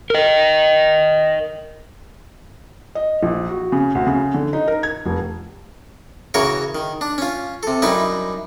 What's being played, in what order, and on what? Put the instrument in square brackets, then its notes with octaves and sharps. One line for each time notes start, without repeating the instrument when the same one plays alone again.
[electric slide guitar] A#4 D#5
[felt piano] D#5
A#1
F#4
C#3
D2
C#3
D3
D#4
A#4
G#6
F1
[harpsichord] C#3 E3 F#4 A#4 C#5 C#6
D#3
D4
C#4 F4
C3 A4
F#2 G3 D#4 E4 B4